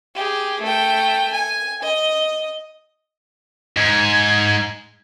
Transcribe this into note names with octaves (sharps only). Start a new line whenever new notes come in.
G4 G#4
A3 G5
G#5
D#5
G#2 G#6